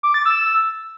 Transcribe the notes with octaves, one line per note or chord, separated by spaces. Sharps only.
D6
A6
E6